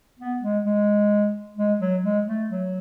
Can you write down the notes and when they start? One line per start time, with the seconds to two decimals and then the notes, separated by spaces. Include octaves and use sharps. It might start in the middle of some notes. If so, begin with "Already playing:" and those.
0.19 B3
0.42 G#3
0.65 G#3
1.57 G#3
1.81 F#3
2.03 G#3
2.27 A3
2.49 F#3